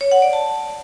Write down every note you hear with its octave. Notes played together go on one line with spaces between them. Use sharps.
C#5
F#5
D5
A5